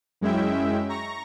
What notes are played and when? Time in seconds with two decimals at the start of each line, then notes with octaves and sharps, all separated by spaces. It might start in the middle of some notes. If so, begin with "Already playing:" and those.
0.21 F#2 G#3 C#4 E4 E5 G5
0.89 A#5 C#6 A#6